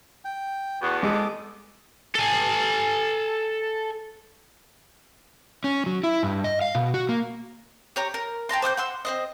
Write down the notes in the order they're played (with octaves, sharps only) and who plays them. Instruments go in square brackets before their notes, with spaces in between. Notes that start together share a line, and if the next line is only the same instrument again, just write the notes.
[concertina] G5
[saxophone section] E2 A2 B3 [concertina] F#4
[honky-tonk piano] G#3 [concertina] A4 D6 D#6
[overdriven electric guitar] A4 G#5
[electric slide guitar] C#4
F#3
E4
G2
D#5
F5
B2
F#4
A#3
[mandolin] G4 C#5 A#5
A#4
G5 A5 A#5 C6
C5 D6 D#6 G6
F#5 C6 E6
C4 C5 D#5